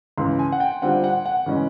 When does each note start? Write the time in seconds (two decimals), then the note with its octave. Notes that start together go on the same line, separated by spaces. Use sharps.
0.18 C#2 C#3 E3 C6
0.39 G#5
0.52 F#5
0.60 G5
0.82 D3 G3 C4 F4 F#5
1.04 F#5
1.26 F#5
1.46 C#3 E3 G#3 C#4